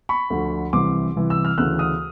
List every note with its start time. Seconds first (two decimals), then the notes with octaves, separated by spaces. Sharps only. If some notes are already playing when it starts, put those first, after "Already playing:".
0.09 B5 C#6
0.30 D2 D3 F3
0.73 C2 C3 E3 C6 D6
1.16 C2 C3 E3
1.30 E6
1.45 F6
1.58 D2 C#3 E3 E6 F#6
1.79 D#6 F6